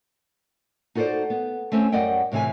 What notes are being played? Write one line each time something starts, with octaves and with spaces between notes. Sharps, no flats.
D#4 F#4 A4 A#4 C5 D5
B3
A3 C4 C#4 C5
F#2 G3 D5 D#5 F#5 G5
A2 C3 E3 G#4 G#5